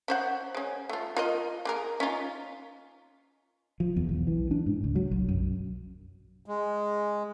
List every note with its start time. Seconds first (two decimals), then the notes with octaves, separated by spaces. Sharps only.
0.08 C#4 C5 F#5
0.55 G#3 C#4
0.89 A3 F4
1.17 F4 A#4 D#5
1.65 A#3 G#4 A#4
2.00 C#4 D#4 F4
3.80 F3
3.96 E2
4.09 B1
4.27 E3
4.51 D4
4.66 G#2
4.84 C#2
4.95 F#3
5.11 B1
5.28 F#2
6.46 G#3